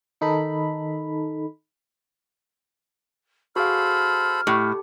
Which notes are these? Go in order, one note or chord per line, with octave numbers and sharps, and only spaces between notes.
D#3 D#4 A4 B5
F#4 G#4 A4 C5 F5 B5 F6
A2 G4